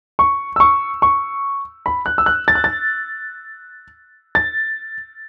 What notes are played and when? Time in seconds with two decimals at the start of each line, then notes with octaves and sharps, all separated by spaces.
0.19 C#6
0.56 E6
0.60 C#6
1.02 C#6
1.86 B5
2.06 F#6
2.18 E6
2.26 F#6
2.48 A6
2.55 F#6
2.64 A6
4.35 A6